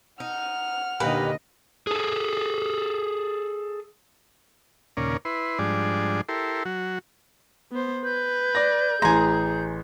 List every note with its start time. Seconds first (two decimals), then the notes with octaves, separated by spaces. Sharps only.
0.20 D#4 F#5 F6
1.00 D#2 A#2 D3 G4 B4 D#5
1.87 G#4 A4
4.97 D#2 A#2 C#3 C#4 A#4 D5
5.25 E4 B4 C6
5.59 G#2 F3 G3 D4 G#4 D5
6.29 E4 G4 A4 A#4 C6
6.65 F#3 F#4
7.72 B3 C5
8.04 B4 G6
8.55 D5 A#6
9.02 A1 G#4 G#5 A#5 C6